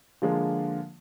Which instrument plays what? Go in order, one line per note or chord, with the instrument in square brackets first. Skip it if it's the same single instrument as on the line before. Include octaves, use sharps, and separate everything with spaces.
[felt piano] D3 F3 G#3 A#3 F4